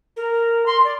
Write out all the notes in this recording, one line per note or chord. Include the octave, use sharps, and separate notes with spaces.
A#4
C6
D5